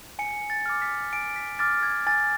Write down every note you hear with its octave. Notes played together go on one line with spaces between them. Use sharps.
G#5 C#7
A6
D6 F6
B6
G#5 D7
B6
D6 F6 A6
G#6
G#5 A6